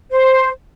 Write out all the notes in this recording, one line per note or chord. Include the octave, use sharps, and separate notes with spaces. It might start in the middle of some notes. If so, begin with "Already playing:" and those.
C5